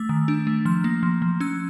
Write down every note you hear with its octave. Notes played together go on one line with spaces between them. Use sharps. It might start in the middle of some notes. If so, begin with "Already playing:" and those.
Already playing: A3 E6
D#3
D4
A3
F3 F6
A#3
F3
F3
C#4 E6